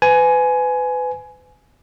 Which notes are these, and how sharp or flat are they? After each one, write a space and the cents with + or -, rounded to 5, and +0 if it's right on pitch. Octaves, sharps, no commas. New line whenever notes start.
B4 +30 G#5 +15